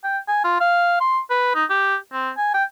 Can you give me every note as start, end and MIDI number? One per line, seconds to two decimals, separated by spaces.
0.04 0.18 79
0.28 0.40 80
0.44 0.56 65
0.60 1.00 77
1.00 1.20 84
1.30 1.52 71
1.55 1.65 63
1.70 1.96 67
2.13 2.30 60
2.37 2.53 80
2.54 2.64 79